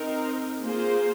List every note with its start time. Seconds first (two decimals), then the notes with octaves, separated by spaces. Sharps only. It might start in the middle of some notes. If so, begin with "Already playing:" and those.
Already playing: C4 D#4 A#4
0.61 A#3 F4 G#4 C5